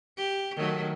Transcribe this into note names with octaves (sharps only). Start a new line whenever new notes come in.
G4
D#3 F#3 A3